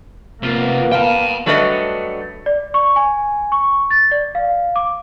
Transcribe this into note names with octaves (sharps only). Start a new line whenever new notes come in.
C3 A#3 B3 F4
F5 G5 A5
F#3 G3 A3 D4 B4 D#5
D5
C#6
G#5
C#6
A6
D5
F5
D6